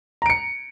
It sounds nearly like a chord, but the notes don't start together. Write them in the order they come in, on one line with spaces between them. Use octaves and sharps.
A#5 D7 C#7